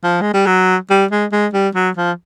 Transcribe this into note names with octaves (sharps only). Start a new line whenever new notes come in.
F3
G#3
G3
F#3
G3
G#3
G#3
G3
F#3
F3